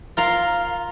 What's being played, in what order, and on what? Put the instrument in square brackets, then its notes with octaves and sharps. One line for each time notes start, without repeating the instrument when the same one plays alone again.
[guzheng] F4 A#4 F5